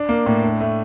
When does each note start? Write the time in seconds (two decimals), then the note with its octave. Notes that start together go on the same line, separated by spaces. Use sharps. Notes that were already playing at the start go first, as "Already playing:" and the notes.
Already playing: D4
0.09 A#3
0.26 A2
0.43 D4
0.61 A3